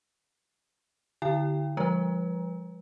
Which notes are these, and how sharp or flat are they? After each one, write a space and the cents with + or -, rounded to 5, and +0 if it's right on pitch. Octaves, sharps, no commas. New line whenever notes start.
D3 +0 E4 -20 G5 +15
F3 +0 G#3 -40 B4 -20